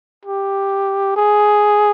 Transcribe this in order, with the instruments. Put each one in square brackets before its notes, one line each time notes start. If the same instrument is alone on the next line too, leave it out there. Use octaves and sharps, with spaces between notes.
[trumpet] G4
G#4